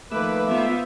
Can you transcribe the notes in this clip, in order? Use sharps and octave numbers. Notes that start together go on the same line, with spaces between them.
D#3 F3 A3 A#3 B4 D6 E6
B3 F4 C5 E5